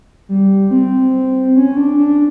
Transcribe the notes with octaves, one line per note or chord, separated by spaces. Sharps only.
G3
C4
C#4
D4
D4